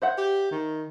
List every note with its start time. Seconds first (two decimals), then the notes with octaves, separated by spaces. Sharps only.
0.02 C5 E5 F#5
0.18 G4
0.51 D#3